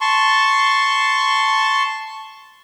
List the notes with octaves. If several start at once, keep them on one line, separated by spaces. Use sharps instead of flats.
A5 C6 C#6